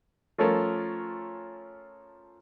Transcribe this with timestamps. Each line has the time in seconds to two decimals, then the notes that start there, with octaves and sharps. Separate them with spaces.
0.38 F3 A3 C#4 F4 A4 A#4